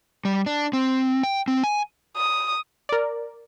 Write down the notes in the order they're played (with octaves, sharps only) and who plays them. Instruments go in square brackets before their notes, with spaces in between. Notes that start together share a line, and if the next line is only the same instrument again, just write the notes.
[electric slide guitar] G3
D4
C4
G5
C4
G#5
[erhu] D#6
[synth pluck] A#4 D5